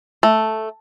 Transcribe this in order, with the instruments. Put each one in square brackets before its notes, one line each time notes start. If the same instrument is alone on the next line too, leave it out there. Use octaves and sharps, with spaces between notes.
[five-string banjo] A3